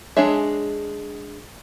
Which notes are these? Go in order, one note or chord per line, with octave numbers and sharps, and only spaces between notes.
G#3 D4 G#4 C#5 E5